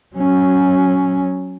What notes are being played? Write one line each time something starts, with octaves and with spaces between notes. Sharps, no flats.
F#3 C#4